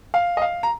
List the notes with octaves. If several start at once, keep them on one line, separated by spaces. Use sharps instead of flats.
F5
D#5
F5
A#5